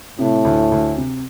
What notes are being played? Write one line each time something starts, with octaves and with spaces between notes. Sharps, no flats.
A2 C3
D2
D2
C3